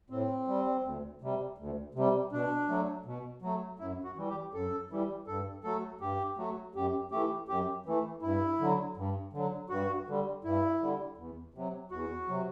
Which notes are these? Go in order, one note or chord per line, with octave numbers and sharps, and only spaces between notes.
A2 C4
G3
D2
C3 G3
D2
C3 G3
B2 D4
F#3 A3
B2
F#3 A3
F#2 E4
F#4
E3 G3
G4
F#2 A4
E3 G3
G2 A4
F#3 A3 A4
G2 G4
F#3 A3
F#2 G4
E3 A3 G4
F#2 G4
E3 A3
G2 E4
D3 F#3
G2
D3 F#3
G2 F#4
D3 G3
G2 E4
D3 G3
E2
C3 F#3
E2 F#4
C3 F#3